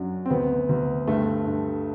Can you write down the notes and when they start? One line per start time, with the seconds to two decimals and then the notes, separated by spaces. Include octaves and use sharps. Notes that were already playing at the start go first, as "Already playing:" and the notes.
Already playing: F#2 F#3 D4
0.26 C4
0.30 D2 B3
0.69 D2
1.07 G2 A3
1.47 G2